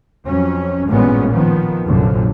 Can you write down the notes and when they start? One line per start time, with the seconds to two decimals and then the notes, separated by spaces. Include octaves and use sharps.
0.26 F2 F#3 C#4
0.88 A1 G2 A#2 G#3 B3 C#4
1.33 D#3 F3 B3
1.86 F1 A#1 F#2 A#2 D3 F3